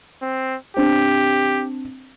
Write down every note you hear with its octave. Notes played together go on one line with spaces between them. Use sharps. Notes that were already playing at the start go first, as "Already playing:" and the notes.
C4
C4 D4 G4 C5